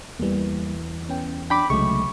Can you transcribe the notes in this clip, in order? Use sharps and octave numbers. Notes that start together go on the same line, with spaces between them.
E2 E3 G3 A#3
B3 C#4 G5
D4 G5 B5 D6
C2 C#3 F#3 G#3 A3 C#6